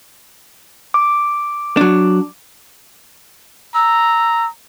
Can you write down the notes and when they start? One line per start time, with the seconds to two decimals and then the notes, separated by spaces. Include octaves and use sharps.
0.94 D6
1.77 F#3 D4
3.75 A#5 E6